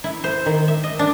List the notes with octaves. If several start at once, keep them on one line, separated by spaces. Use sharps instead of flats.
E4
C5
D#3
E5
D#5
D4